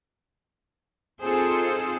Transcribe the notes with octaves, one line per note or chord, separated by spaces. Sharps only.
C4 D#4 F4 G#4 A4 C5